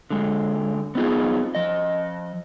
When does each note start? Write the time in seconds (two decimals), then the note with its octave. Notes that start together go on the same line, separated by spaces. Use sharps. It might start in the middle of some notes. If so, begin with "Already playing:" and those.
0.10 D3 G#3
0.95 B3 C4 D#4 F4 G#4
1.55 F3 D#5